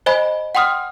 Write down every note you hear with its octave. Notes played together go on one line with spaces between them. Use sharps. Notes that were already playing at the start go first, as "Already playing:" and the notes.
C5 D#5 G#5 B5
F#5 G5 C6 D#6 F6